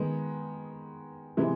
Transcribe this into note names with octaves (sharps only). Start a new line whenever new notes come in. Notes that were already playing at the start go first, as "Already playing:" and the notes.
Already playing: D#3 G#3 B3
C3 E3 G#3 B3